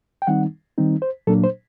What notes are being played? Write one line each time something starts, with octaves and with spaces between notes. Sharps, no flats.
G5
D#3 G3 C4 D#4 F#5
D#3 G3 C4 D#4
C5
A#2 F#3 A#3 D4 A4
C5